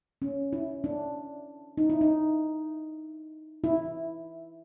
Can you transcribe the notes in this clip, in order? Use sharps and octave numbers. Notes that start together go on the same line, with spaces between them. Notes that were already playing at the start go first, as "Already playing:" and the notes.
C#4
E4
D4
D#4
E4
D#4
E4